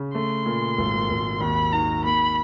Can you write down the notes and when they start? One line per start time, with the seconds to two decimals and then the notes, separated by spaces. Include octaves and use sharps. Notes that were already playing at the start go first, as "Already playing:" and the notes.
Already playing: C#3
0.14 A3 C6
0.46 A#2
0.78 G#1
1.09 G#1
1.41 D#2 B5
1.73 D#3 A#5
2.04 A#3 B5